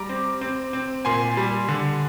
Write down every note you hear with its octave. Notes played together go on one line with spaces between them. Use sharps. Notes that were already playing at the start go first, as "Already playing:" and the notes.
Already playing: G3 A#5 D6
C4
C4
C4
A#2 G#5 C6
G3
D3